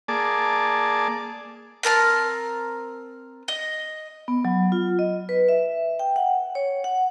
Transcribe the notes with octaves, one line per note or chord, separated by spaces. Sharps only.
A#3 G#4 D5 A5
C4 A#4 A5 F6
D#5
B3
F#3
F4
D#5
B4
E5
G5
F#5
C#5
F#5